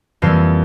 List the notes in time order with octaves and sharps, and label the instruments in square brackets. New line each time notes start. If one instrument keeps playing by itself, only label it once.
[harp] F2 E3 G3 A#3 F5